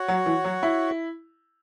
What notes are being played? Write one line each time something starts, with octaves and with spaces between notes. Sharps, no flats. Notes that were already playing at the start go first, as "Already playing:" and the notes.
Already playing: F#4 C#5 F#5
F#3
E3
F#3
E4